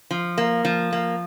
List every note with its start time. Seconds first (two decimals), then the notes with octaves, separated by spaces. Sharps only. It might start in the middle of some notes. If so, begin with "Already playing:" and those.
0.11 F3
0.38 A#3
0.65 F3
0.93 A#3